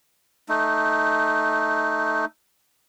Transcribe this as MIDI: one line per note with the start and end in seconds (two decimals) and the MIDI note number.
0.49 2.25 57
0.49 2.25 63